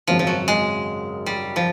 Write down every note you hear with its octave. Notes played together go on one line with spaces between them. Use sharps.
G#1 F#2 C#3 F3
F3
F#3
G#3
G3
F3